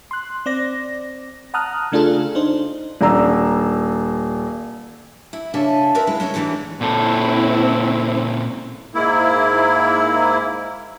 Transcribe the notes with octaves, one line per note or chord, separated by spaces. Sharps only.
C6 F#6
C4 D5 A#6
F#5 A5 A#5 D#6 F6 F#6
C#3 A3 D4 F4 G#4 A4
D4 D#4 C5
D#1 D4 D5 A#5 E6
E4
C#3 D4 A4 E5 G#5
C4 E4 A#4 B4
G#3 E4 B4
G#3 C#4 E4 C#5
E2 D3 E3 F#3 G3 D#4
A#2 C4 C#4 E4 A4
G#2 A#3 E4